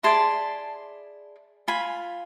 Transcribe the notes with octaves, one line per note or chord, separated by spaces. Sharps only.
E4 G#4 D5 A5 C6
F4 G#5 B5